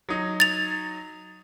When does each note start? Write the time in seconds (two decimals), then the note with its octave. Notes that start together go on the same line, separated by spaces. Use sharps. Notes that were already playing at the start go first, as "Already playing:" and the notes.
0.09 F#3 D#4
0.40 A6 F7